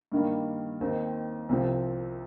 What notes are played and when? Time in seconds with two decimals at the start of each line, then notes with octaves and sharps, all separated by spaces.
0.12 G2 D#3 G3 A#3
0.81 D#2 D#3 C4
1.49 C2 C3 F3 C4